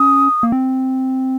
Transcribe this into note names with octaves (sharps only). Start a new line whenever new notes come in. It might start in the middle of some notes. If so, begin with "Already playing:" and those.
Already playing: C#4 D#6
A#3
C4